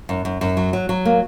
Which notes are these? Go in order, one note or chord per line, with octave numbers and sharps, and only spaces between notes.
F#2
F#2
F#2
F#3
F#3
F#3
A#3